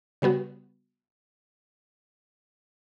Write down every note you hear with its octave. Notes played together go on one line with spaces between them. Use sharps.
C#3 G3 B3 F#4